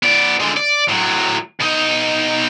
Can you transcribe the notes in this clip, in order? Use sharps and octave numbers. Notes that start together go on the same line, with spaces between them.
B3 D5
D3 G#3
D5
A2 F#3
B2 D#4